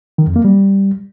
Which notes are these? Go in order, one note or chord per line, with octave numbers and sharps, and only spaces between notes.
D#3
F2
A#3
G3